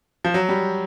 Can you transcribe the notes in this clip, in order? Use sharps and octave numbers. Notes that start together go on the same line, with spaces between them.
F3
F#3
G3